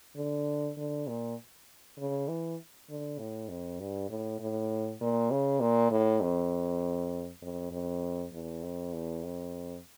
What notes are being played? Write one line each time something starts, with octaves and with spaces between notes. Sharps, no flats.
D3
D3
A#2
C#3
E3
D3
A2
F2
G2
A2
A2
A#2
C#3
A#2
A2
F2
F2
F2
E2
F2
E2
F2